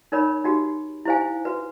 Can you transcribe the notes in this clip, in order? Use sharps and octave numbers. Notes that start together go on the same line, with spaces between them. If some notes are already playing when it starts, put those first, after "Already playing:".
D#4 A#4 C#5 B5
D#4 F#4 G4
E4 G4 C5 F5 G#5
F#4 B4